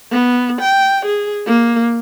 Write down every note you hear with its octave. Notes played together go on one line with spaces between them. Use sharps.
B3
G5
G#4
A#3